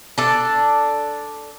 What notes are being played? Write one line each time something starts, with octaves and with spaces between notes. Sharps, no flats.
D4 A4